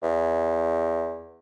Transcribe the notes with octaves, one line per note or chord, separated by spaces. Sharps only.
E2